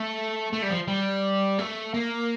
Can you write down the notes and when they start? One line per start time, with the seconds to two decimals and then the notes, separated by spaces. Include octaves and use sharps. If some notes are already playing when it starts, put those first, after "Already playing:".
Already playing: A3
0.53 A3
0.62 G3
0.70 F3
0.88 G3
1.59 A3
1.94 A#3